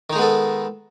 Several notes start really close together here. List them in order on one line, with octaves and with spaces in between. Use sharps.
D#3 D#4 G#3 B3 A4